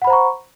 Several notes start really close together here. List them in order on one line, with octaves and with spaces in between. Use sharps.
F#5 B5 C5 A#5 C#6